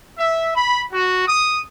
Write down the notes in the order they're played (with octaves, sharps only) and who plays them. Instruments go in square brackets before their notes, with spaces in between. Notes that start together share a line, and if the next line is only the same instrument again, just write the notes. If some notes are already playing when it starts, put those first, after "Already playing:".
[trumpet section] E5
B5
F#4
D#6